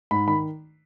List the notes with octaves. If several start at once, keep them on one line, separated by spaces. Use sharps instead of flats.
G#2 B5
D#3 B5